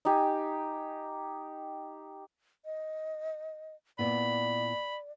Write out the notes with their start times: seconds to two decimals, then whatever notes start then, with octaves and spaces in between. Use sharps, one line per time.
0.05 D#4 G4 G#5
2.65 D#5
3.99 A#2 B3 E4 D5 B5